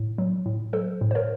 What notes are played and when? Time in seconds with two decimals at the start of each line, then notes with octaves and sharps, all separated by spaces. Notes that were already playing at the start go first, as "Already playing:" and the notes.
Already playing: A2
0.18 F#3
0.46 A2
0.73 F#3 A4 C5
1.01 A2
1.11 C5
1.15 A#4 C#5